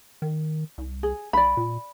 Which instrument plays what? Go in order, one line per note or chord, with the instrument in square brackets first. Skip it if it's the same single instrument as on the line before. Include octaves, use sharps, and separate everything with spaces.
[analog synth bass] D#3
C2
[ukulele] G#4
[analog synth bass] B1 [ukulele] D5 B5
[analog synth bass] A#2